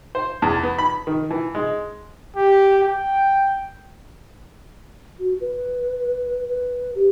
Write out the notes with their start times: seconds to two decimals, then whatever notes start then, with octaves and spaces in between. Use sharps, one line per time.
0.15 C5
0.42 E2
0.63 B3
0.79 B5
1.07 D#3
1.31 E3
1.55 G#3
2.36 G4
2.84 G5
5.19 F#4
5.41 B4
6.48 B4
6.95 G4